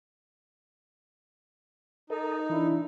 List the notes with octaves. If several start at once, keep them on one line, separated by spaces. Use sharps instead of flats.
D#4 A4 A#4 D#5
E3 D4 E4